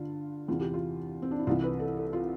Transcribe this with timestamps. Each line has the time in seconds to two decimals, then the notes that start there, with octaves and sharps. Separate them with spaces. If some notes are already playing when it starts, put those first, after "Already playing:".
Already playing: G2 D3 F4
0.48 E2 C3 E3 F4
0.61 G4
0.74 F4
1.22 C4
1.31 D4
1.39 E4
1.47 C2 C3 E3 F4
1.63 B4
1.80 A4
1.97 A4
2.13 F4